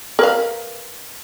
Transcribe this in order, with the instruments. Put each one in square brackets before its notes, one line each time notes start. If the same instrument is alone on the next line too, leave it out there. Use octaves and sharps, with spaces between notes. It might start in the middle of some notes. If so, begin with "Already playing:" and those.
[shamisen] A#4 B4 F5